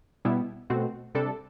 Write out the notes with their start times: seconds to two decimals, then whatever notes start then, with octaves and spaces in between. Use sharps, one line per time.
0.25 B2 G3 B3 E4
0.70 B2 A3 C4 F#4
1.15 C3 G3 D4 A4